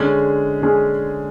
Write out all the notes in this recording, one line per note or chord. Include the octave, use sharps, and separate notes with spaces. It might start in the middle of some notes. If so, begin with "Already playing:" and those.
Already playing: D3 G#3 C#4 G#4
D3 G#3 C#4 G#4